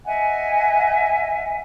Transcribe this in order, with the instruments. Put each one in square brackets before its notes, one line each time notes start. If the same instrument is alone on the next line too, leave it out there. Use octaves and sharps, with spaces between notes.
[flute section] D#5 E5 F#5 G#5